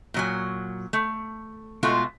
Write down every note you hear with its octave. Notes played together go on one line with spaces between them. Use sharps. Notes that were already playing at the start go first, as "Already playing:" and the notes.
A#2 F#3 G#5
A3
B2 G#3 A3 F4 F#4